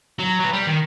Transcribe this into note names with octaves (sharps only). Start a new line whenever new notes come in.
F#3
F#3 B4
G3
D#3